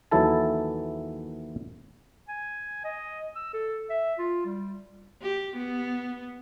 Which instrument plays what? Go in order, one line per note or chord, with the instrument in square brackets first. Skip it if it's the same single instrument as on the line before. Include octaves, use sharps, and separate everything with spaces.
[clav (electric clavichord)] D#2 E3 F#3 E4 A4 A5
[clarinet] G#5
D#5
E6
A4
E5
F4
G3
[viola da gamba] G4
B3